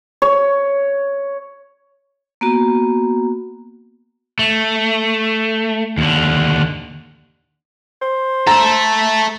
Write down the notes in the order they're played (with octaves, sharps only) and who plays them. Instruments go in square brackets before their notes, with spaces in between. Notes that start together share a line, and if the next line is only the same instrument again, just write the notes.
[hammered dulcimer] C#5
[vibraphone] A#3 B3 F#4
[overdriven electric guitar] A3
D#2 D3
[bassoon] C5
[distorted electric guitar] A4 E5 [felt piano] A#5